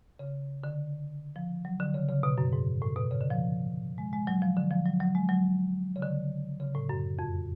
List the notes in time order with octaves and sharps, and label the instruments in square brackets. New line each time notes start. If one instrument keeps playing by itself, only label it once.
[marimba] C#3
D3
F3
F#3
D3
C#3
C#3
B2
F#2
G#2
A2
B2
C#3
D3
F3
G#3
G#3
F#3
F3
D3
F3
F#3
F#3
G#3
F#3
C#3
D3
C#3
A2
F#2
F2